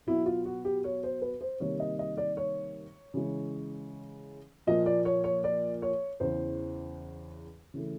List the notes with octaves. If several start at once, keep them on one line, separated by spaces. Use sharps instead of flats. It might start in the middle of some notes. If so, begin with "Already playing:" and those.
B2 F#3 B3 E4
F4
F#4
G4
C#5
C5
B4
C5
C3 D#3 G3 A#3 C#5
D#5
D#5
D5
C#5
C#3 E3 G#3
A#2 F3 A#3 D#5
D5
C#5
C#5
D5
C#5
E2 C#3 E3 C5
C#3 E3 A3